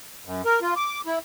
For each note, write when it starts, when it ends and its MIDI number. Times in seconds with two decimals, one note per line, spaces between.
0.25 0.42 42
0.45 0.60 70
0.61 0.74 65
0.76 1.01 86
1.06 1.19 64